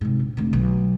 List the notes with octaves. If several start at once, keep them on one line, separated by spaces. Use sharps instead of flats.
G#2 C3
A#1
F1 D3
B1